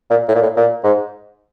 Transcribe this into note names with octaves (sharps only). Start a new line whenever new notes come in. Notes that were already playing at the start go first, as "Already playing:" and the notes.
A#2
A2
A#2
A2
A#2
G#2